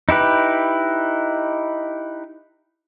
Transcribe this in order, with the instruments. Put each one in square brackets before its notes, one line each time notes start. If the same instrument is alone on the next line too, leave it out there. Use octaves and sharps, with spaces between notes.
[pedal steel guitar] D#4 E4 G4 B4